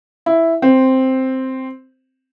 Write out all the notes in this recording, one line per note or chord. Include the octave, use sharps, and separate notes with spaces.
E4
C4